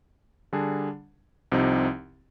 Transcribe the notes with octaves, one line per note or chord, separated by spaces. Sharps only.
D3 G3 D4 G#4
C2 C3 F3 C4 D#4